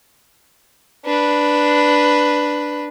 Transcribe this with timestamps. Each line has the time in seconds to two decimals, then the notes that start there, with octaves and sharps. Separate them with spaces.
1.05 D4 B4